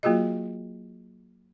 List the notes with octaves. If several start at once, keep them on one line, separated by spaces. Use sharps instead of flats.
F#3 A#3 F4 F#4 G#4 D#5